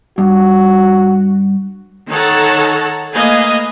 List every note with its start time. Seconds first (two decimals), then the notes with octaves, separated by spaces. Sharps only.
0.18 G2 F#4
2.10 D#3 A4 C#5 F#5 A5 A#5
3.14 A3 A#3 B4 D#5 F5 G#5